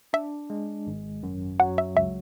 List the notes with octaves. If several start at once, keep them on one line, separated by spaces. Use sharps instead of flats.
D4 E5
G#3
G#1
F#2
F#3 F#5
E5
C#2 E5